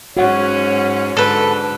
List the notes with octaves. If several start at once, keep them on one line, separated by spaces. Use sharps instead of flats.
G#2 C#4 F#4 C#5 F#5
G#2 D3 A4 B4